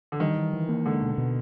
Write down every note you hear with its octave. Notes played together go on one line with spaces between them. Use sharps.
D3
D#3 G3
E3
E3
A#3
D3 G#3
B2
B2